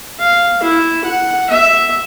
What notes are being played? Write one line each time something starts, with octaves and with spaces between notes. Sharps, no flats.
F5
E4
F#5
E5